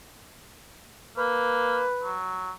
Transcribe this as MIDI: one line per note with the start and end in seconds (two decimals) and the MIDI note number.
1.18 1.84 58
1.18 2.16 71
2.03 2.52 54